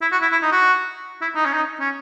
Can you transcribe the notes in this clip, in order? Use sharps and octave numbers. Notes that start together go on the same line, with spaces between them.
E4
F#4
E4
E4
D#4
F#4
E4
D#4
C#4
D#4
C#4